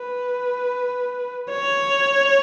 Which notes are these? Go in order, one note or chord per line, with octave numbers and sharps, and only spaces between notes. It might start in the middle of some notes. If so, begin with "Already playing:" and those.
Already playing: B4
C#5